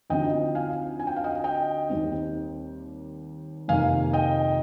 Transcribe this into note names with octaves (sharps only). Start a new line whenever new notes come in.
D2 D3 F3 C4 D#4 D#5 G5
F5 G#5
G#5
G5
F5
D#5 G5
D#5 G5
D#2 D#3 G3 C4
F2 C3 D#3 A#3 F5 G#5
D#5 G5